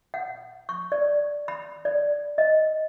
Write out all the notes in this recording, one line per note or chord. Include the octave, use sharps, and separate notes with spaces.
F#5
C#6
D5
B5
D5
D#5